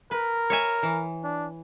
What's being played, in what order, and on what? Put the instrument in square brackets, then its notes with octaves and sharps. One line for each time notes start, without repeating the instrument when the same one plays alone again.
[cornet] A#4 [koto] B4
[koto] C#5 E5 G#5
E3
[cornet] D4